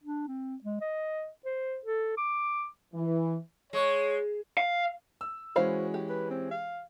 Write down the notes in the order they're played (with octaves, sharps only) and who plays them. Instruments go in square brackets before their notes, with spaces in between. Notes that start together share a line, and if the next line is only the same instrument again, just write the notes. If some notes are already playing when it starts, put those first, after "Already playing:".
[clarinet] D4
C4
G#3
D#5
C5
A4
D6
[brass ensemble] E3
[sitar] G#3 [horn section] C#5
[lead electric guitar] F5
[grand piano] E6
[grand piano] E3 G#3 C#4 [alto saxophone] F#4 [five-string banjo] C5 F5 B5
[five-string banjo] G4
[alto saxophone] B4
C4
F5